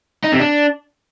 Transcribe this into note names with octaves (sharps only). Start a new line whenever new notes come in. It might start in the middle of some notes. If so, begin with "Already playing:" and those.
D#4
C3
D4